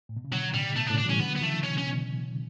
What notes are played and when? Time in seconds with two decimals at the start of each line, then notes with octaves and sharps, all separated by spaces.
0.09 A2
0.17 B2
0.25 C#3
0.31 B2 D3 F#3
0.54 A2 C#3 G3
0.76 B2 A3
0.87 D4
0.90 A2 C#3
0.98 D4
1.05 E3 G3 C#4
1.20 D3 F#3 B3
1.36 B3
1.41 C#3 E3 A3
1.64 B2 C#4
1.78 C#3 C#4
1.86 B2